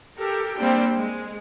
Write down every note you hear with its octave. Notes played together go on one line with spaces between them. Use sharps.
G4 A4 A#4
G3 A#3 C4 D4 C5 G5
G#3